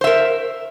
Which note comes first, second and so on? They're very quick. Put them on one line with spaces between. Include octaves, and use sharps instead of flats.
C5 E5 A#4